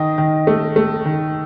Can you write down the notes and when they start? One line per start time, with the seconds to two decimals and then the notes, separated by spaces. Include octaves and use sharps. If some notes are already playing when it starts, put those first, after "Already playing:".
Already playing: D#3 D#5
0.18 D#3
0.47 A3
0.76 A3
1.06 D#3